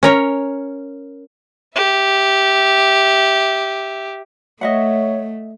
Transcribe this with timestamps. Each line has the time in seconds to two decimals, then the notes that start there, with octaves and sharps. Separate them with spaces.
0.03 C#4 A#4 C#5
1.76 G4 E5
4.61 A3 C#5 D#5 E5 F#5